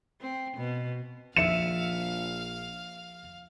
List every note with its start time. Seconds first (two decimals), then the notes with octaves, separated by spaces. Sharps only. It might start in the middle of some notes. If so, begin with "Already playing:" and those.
0.21 C4
0.57 B2
1.37 A#1 F3 E5 F5 C#7 E7